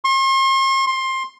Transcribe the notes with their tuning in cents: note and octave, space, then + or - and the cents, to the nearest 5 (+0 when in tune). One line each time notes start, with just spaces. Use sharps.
C6 +45
C6 +20